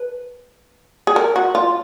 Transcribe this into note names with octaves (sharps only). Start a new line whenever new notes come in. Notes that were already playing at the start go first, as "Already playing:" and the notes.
Already playing: B4
G#4
A#4
F#4
F4